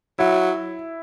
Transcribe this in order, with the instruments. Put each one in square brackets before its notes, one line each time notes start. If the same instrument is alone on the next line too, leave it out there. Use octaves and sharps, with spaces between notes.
[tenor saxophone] F#3 [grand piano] E4